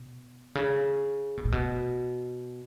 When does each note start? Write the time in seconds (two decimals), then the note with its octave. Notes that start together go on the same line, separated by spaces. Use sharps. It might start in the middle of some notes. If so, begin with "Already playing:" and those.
Already playing: B2
0.55 C#3
1.37 B2
1.45 A#2
1.52 B2